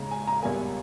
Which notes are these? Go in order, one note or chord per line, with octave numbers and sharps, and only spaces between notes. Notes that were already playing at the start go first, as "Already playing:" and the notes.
Already playing: D#2 C#3 G#3 A#5
G#5
A#5
C#2 B2 G3 A#3 G#5